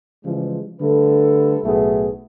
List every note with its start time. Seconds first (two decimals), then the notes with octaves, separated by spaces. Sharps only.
0.25 C#3 E3 F3 G3 G#3
0.80 D3 G3 A3 A4 B4
1.64 B1 A2 A3 B3 G#4